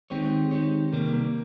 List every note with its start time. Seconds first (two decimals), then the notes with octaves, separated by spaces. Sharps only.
0.10 D#3 G#3 C4 D#4 G4 C#5
0.51 D#3 G#3 D#4 G4 C#5
0.92 C2 C3 D#3 G3 A#3
1.13 A#3